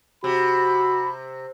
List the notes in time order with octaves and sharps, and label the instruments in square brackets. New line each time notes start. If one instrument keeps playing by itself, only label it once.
[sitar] C3 [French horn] F#4 [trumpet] B5